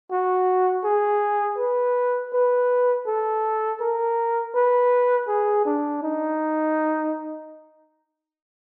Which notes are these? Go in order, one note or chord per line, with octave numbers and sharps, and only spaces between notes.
F#4
G#4
B4
B4
A4
A#4
B4
G#4
D4
D#4